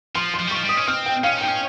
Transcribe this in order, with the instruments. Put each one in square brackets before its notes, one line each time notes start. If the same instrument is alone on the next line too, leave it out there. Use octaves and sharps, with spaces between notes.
[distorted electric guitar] F3 [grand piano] C6
[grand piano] C6
[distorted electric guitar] F3
G3
[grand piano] C#6
[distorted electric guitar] F3
G3
[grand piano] D#6
[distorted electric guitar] C#4
[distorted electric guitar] C4 [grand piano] F6
[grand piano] G5
[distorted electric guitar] C#4 [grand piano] F5
[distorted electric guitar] D#4 [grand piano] G5
[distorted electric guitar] C#4